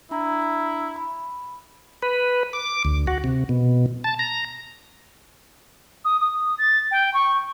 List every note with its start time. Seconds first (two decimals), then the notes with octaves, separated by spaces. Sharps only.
0.11 D4 E4 A#5
0.96 B5
2.02 B4
2.53 D6
2.85 D2
3.07 F#4
3.24 C3
3.49 B2
4.04 A5
4.19 A#5
6.05 D#6
6.20 D#6
6.58 A6
6.91 G5
7.14 C#6